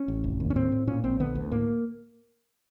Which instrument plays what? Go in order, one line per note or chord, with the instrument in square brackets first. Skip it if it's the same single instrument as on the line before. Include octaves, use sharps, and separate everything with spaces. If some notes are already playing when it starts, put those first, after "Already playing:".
Already playing: [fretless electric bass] C#4
A1
F1
D#2
C#4
A2 C4
A2
A#2 C#4
A#1 C4
D3 B3
D2
A2 A#3